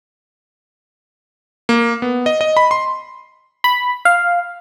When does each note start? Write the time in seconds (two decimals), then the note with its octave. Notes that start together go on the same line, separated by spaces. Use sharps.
1.69 A#3
2.02 B3
2.26 D#5
2.41 D#5
2.57 B5
2.71 C6
3.64 B5
4.05 F5